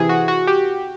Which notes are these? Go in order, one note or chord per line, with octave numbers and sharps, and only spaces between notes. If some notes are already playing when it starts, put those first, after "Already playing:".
Already playing: C3 E3 G#4
F#4
F#4
G4